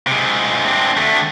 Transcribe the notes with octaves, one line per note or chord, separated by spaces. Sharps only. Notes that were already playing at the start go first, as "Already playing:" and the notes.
C3 G#3
C4 D4
D3 A3